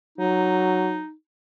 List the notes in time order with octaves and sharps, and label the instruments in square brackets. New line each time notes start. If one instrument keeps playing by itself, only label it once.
[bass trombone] F#3 [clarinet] D#4